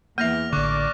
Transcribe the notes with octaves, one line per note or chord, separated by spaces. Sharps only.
E2 A#3 E5 F6 A#6 F7
A1 D3 D5 C#6 D6 F#6